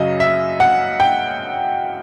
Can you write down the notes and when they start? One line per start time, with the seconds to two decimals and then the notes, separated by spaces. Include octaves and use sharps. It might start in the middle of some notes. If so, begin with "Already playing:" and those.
Already playing: F#2 C#3 F#3 D#5
0.20 E5
0.60 F#5
1.00 G5